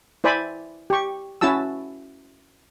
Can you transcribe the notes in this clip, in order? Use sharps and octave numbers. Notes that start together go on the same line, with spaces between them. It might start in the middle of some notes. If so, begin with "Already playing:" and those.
E4 C5 D5 G#5 B5
G4 C#6
C#4 E4 F#4 A5 E6